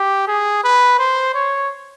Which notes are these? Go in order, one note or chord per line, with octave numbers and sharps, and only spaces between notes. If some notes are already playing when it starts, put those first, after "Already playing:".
Already playing: G4
G#4
B4
C5
C#5